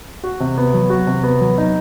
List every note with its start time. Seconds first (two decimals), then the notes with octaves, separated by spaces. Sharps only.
0.24 F#4
0.40 C3
0.57 B3
0.74 F#3
0.90 F#4
1.07 C3
1.23 B3
1.41 F#3
1.58 D#4